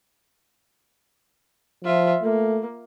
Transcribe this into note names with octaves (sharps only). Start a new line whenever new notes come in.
F3 F4 E5
A3 A#3